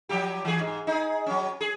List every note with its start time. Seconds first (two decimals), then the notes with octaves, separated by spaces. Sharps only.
0.09 F3 F#3 G4
0.45 E3 G#4
0.60 G#2
0.87 D#4 G#4
1.26 F#3 C#4
1.61 G#4